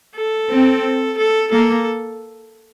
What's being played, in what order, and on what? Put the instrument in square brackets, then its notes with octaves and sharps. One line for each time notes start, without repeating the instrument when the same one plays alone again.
[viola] A4
[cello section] C4
[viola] A4
[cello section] A#3 [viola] A4